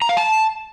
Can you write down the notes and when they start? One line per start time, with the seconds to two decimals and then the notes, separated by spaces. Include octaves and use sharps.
0.02 A#5
0.09 F5
0.17 A5